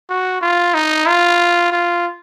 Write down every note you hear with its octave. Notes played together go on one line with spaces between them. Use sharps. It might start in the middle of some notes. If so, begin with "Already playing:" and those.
F#4
F4
D#4
F4
F4